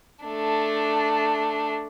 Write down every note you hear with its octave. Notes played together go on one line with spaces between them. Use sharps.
A3 D4